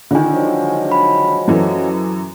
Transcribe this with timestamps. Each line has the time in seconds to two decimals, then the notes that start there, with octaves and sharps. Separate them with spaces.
0.11 D3 D#3 F4 G#5
0.31 F3 F#3 G#3
0.92 B5
1.48 F#2 E3 F#4 A4